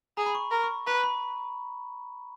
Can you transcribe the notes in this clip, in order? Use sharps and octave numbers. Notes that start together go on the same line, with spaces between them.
G#4 A#5
B5
C#6
A#4
C#6
B4 A#5
B5